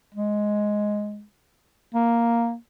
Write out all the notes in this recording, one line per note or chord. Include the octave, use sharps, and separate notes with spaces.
G#3
A#3